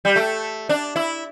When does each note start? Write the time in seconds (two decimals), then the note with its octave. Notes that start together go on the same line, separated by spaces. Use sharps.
0.05 G3
0.16 A3
0.69 D4
0.96 E4